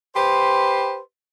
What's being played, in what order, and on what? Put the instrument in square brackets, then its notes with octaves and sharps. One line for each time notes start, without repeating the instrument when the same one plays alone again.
[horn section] G4 B4 C5